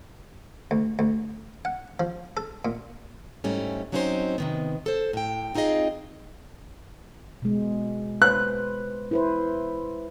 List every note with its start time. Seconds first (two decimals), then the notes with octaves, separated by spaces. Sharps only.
0.71 D2
0.99 D2
1.65 F#5
2.00 F3
2.37 A4
2.65 A#2
3.44 G#2 G3 A3 C#4 E4
3.92 F#3 C4 C#4 D#4 E4 C5
4.38 C3 D#3 B3
4.86 A4 C5
5.13 A2 G5
5.55 C4 D#4 F4 G#4 D#5 G5
7.42 B2 G#3
8.22 B4 C5 F#6
9.11 E4 B4 C5